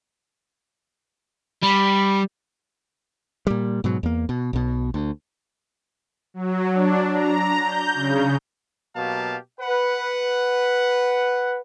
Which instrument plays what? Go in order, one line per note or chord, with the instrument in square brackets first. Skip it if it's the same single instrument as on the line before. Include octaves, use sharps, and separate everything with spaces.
[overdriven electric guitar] G3 [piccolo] B5
[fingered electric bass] A#2 G3
G#2 B2 F#3
E2 A#3
B2
B1 B2
D2
[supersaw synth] F#3
D4
A#5
G6
C#3
[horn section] B2 F#3 A#3 G4 F5 A5
B4 F#5